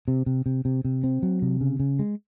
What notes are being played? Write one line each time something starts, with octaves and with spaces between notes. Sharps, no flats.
C3
C3
C3
C3
C3
C4
F#3
C3
C#3
C#3
G#3